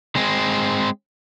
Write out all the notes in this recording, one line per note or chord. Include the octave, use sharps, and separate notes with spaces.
G#3 C4